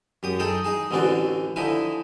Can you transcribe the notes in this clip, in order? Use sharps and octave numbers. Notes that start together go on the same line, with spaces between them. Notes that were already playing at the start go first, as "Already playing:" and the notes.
F#2 G4 D#6
D#4 G#4 A4 G5 D#6
D#4 G#4 G#5
A1 D3 E3 C4 F#4 D5
D3 F3 D#4 E4 G#5